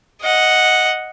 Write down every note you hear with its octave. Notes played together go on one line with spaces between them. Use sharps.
D#5 F#5